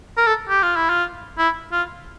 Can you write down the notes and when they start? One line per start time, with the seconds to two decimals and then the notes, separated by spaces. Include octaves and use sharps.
0.17 A#4
0.27 A4
0.49 G4
0.63 F4
0.76 E4
0.89 F4
1.38 E4
1.72 F4